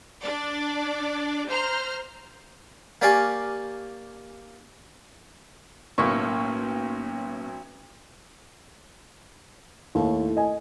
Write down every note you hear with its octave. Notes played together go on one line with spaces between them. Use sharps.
D4 D5
C5 A#5 F6
A#3 G4 D5 F5 G#5 C#6
B1 A2 A#3 C#4 C#6
D#2 A2
D#5 G#5